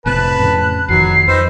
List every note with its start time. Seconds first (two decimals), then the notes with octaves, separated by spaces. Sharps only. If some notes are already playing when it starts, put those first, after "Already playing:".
0.06 F1 A2 C3 B4 A5 F#6
0.39 F2 A2 C#3
0.89 F1 F2 D#3 F#3 C7
1.28 F2 C4 D#4 B4 E6